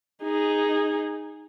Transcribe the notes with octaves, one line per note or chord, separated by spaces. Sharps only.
D#4 G#4